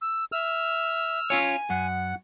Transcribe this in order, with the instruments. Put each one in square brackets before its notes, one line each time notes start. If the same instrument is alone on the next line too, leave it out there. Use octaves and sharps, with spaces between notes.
[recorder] E6
[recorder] E5 [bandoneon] E6 F6
[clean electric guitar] C#4 F4 C#5 [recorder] G#5
[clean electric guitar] F#2 [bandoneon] F#5